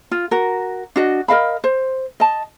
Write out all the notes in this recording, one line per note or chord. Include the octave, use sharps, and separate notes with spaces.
F4
F#4 A#4
D4 F#4 D#5
A#4 D#5 F5 B5
C5
D#5 A5